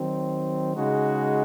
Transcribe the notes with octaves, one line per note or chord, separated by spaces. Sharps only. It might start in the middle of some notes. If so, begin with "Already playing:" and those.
Already playing: D#3 F#3 C4
C#3 G#3 D#4 F#4